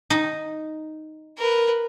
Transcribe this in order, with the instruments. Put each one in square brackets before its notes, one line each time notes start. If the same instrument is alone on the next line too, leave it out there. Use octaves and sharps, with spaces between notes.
[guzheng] D#4
[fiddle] A#4 B4